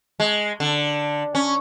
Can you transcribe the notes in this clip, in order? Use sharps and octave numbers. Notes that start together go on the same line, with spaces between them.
G#3
D3
C#4